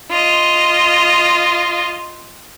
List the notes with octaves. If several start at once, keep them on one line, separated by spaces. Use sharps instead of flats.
F4 D#5